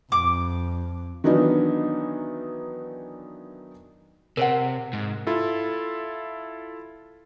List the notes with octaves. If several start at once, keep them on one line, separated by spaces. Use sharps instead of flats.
F2 D6
D#3 E3 F#3 B3 D4 D#4
C3 A#4 C5 F#5
G#2
E4 F4 A4